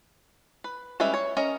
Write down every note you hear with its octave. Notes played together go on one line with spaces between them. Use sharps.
B4
G3 G#3 C#4 B4 E5
C#5
C#4 A#4 D#5 A#5